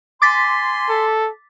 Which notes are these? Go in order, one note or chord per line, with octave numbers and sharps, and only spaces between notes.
G#5 C6 D6 A6 B6
A4